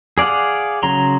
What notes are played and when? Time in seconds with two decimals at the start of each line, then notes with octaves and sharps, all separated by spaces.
0.18 G#4 D5 F5 F#5
0.83 C#3 F#3 A#5 C6